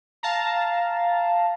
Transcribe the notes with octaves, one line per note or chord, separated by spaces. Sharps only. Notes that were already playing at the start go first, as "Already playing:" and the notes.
F5 A5 A#5